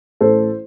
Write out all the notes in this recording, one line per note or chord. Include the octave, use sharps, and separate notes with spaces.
A1 A4 C5